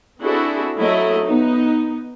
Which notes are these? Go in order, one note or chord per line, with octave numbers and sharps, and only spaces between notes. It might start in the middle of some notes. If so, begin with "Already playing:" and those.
C4 D4 E4 F#4 G#4 A4
F#3 A3 E4 D#5
B3 D#4